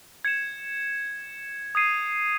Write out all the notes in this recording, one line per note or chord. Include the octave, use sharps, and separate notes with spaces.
G#6 C#7 E7
D#6 G#6 C7 D#7